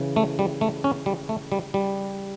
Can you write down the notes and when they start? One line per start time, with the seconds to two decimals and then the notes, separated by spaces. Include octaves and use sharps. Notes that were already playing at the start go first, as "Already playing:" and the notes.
Already playing: C#3 E3
0.16 A3
0.39 G3
0.61 A3
0.84 C#4
1.06 G3
1.29 A3
1.52 G3
1.74 G3